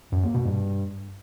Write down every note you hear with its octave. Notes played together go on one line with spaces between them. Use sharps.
F#2
A#3
B2
G2